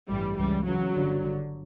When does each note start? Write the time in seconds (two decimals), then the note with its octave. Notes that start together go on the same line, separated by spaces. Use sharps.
0.09 A1 G2 E3 G3
0.38 C#2 C#3 E3 G3
0.65 C#2 C#3 E3 F#3
0.94 G1 G2 D3
1.22 G1 G2 D3